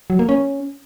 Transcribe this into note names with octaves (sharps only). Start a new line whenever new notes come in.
F#3
A#3
C#4